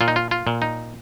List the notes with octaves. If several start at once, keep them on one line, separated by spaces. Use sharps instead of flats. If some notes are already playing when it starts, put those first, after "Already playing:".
A#2 F4
D#4
F4
F4
A#2
D#4